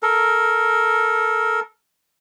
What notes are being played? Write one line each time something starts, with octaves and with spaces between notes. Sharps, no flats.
A4 A#4